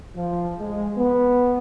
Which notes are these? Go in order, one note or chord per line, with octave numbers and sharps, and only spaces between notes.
F3
G#3
B3